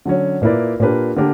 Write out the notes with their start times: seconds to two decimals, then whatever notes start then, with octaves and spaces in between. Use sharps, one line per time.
0.05 D3 F#3 C#4
0.42 A#2 A#3 E4 B4 D5
0.80 A#2 A#3 D4 G4 B4
1.16 D3 A#3 D4 G4 A#4